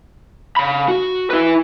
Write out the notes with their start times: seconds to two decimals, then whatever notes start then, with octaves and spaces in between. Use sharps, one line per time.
0.56 C#3 B5
0.88 F#4
1.30 E4 B4